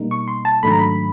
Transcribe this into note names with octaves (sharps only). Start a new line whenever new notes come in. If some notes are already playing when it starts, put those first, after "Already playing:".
Already playing: B2 G3 A#3 D#4
C#6
C6
A5
G#2 D#3 F#3 A3 D4 B5
A#5
B5